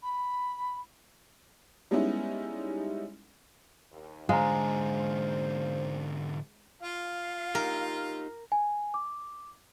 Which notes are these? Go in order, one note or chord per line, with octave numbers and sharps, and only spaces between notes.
B5
G3 G#3 B3 C#4 D#4 E4
D#2
G#2 D3 G#3 C5 F5 A#5
F4 F5
D#4 G4 A#4
G#5
D6